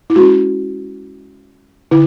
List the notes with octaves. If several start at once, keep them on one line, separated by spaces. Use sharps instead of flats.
E4
G#3 C#4 F#4
D3 E4